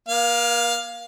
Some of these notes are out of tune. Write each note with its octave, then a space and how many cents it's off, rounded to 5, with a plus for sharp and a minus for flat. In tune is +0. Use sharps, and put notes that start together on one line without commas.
A#3 +40 F5 +5